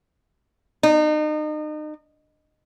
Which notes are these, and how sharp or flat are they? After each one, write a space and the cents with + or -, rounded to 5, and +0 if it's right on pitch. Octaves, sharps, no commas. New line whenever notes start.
D#4 -35